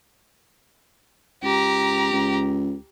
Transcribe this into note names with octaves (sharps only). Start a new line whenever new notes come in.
C#2 G4 A#5
C#2